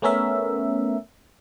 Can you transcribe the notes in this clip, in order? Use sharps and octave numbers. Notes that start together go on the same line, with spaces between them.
A3 B3 C#4 A#4 E5